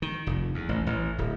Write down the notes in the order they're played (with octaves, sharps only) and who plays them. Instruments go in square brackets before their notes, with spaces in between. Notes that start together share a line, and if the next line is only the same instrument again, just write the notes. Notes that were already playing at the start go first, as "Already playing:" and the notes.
[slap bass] D#3
F1
E2
A1
A1
D1